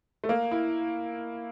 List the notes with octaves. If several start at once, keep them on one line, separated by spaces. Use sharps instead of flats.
A3
A#3
E4